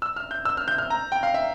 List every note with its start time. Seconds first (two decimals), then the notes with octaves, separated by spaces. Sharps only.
0.02 E6
0.16 F6
0.31 G6
0.45 E6
0.57 F6
0.68 G6
0.78 F6
0.90 A#5
1.12 G5
1.23 F5
1.34 E5